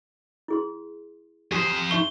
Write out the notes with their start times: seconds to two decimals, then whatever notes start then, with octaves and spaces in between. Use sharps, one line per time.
0.48 E4 G#4 C6
1.52 F2 G4 C5 G#5 D#6
1.91 D#4 E5 C#6 G7